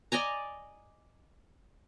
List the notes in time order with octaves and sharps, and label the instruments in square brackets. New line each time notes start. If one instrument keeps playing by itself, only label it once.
[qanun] D5 D#5 G#5 A#5